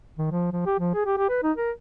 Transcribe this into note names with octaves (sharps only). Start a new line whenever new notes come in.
D#3
F3
F3
G4
F3
G#4
G4
G4
B4
D#4
A#4